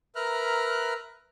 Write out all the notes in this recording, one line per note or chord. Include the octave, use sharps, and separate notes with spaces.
A#4 B4 E5 A#5 F6 F#6